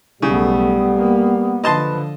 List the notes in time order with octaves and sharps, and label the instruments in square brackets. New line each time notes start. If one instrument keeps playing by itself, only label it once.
[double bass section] B1 A3 [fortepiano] C#3 [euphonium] G3 [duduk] B3
[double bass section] A#3
[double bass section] D3 F3 [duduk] B4 [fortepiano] D#5 A5 C6